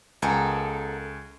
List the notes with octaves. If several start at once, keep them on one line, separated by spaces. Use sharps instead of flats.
C#2 B3 A4 A#4 G#5